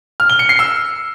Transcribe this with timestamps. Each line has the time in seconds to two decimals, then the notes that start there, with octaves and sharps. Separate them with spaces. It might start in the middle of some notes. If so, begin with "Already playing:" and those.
0.20 F6
0.30 G7
0.39 C#7
0.49 C7
0.59 E6